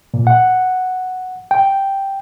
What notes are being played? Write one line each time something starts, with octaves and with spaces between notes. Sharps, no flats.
A#2
F#5
G5